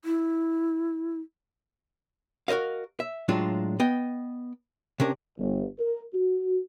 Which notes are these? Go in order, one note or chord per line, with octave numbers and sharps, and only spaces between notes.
E4
F#4 A#4 C5 D#5 F5
E5
A2 F#3 G#3 D4 F4
B3 D#5 G5
C3 C#4 D4 A#4
G1
A#4
F#4